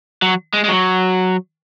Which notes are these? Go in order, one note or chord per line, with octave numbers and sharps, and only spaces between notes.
F#3
G#3
G#3
F#3